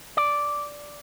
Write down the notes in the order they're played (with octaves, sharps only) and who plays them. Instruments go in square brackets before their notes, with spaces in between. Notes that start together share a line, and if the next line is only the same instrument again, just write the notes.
[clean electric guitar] D5